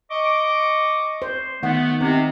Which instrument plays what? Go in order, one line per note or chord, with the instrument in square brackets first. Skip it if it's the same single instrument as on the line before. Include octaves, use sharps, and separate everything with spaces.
[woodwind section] D#5 C#6 D6
[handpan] C5
[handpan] D#3 F#5 [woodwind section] A3 B3
[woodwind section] C3 [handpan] C4 D#4